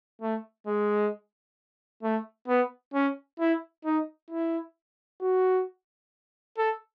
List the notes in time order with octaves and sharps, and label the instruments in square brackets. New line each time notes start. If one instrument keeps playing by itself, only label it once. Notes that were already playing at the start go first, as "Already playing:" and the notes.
[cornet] A3
G#3
A3
B3
C#4
E4
D#4
E4
F#4
A4